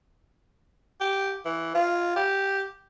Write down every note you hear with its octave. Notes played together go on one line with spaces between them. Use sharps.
G4
E3
F4
G4